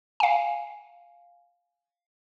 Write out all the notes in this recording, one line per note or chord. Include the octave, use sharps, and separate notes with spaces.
F5 G#5